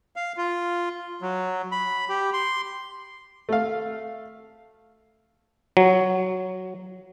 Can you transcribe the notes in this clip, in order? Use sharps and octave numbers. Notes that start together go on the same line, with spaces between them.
F5
F4
F#3
B5
G4
C6
A3 F5
F#3